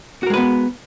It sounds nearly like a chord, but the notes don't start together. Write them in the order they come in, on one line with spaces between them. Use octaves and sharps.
F#4 A#4 G#3 B4 B3